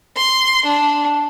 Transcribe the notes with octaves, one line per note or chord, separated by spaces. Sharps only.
C6
D4